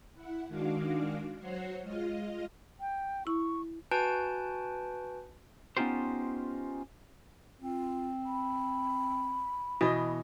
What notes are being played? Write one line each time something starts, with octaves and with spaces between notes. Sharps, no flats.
E4 F#5
D#3 G#3 D4 F#4 F5 D6
F#3 F#4 C5 C#5 F#5 C7
G#3 F4 D#5 F6
G5
E4 C#6
F#4 B4 G#5 A5 G6 D7
B3 C#4 D#4 F4 G4 C5
C4 F4
B5
B2 E3 D#5